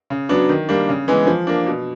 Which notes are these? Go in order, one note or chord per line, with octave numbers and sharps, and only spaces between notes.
C#3
F#3 B3 D4
D#3
G3 A#3 D4
C#3
E3 G#3 B3
F3
A#3 D4
B2